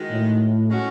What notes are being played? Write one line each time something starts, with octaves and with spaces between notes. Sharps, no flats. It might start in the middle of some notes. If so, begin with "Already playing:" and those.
Already playing: D#3 G#3 D#4 F#4
A2
G#3 C#4 F#4